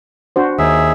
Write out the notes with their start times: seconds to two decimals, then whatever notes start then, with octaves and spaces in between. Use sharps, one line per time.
0.36 D4 F#4 C5
0.59 D#2 G#4 E5